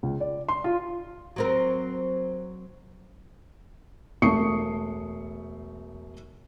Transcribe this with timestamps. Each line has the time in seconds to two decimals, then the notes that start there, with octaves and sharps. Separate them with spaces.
0.03 C#2
0.20 D5
0.49 C6
0.64 F4
1.36 F#3 C4 A#4
4.22 E1 A3 C#6 D#6 C7 C#7